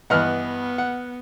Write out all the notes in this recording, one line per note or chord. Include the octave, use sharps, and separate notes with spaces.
G2 E3 B3 D#5 F#5 F6
F#5